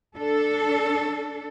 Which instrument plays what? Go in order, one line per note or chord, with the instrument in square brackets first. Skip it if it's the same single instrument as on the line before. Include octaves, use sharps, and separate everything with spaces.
[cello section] D4 A4